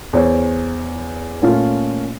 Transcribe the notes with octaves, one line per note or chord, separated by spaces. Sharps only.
E2 C5 C#5
A#2 A3 C#4 F4